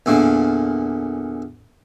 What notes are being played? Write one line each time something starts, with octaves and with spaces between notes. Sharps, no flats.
E2 A#2 D3